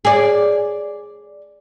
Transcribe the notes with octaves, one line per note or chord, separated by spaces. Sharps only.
G#4 D5